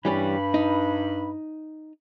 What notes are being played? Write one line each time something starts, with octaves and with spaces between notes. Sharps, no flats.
G2 E3 G3 C#4 B5
D#4